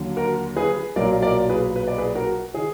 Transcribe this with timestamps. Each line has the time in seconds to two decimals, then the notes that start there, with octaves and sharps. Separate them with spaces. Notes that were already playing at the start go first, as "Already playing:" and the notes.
Already playing: D#2 D3 F#3
0.17 F#4 A#4
0.57 G#4 B4
0.96 B1 A#2 F#3 A#4 D5
1.22 A#4 D5
1.49 G#4 B4
1.76 B4
1.87 D5
1.98 G#4 B4
2.15 F#4 A#4
2.54 D#3 G#4